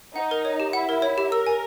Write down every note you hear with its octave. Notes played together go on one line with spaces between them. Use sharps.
D#4 F#5
A#4
C#5
G4
E4 F#5
A#4
C#5
G4
A#4 E6
G#5